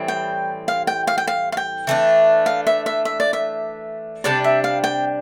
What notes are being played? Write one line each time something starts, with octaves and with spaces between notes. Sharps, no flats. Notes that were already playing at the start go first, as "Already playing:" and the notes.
Already playing: A2 E3 G3 C4
G5
F5
G5
F5
G5
F5
F5
G5
E3 A3 D4
F5
E5
E5
E5
D5
E5
C3 G3 D4 D5
E5
F5
G5